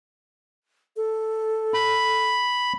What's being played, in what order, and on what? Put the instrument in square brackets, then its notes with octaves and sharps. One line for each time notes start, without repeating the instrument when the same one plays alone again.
[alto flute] A4
[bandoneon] B5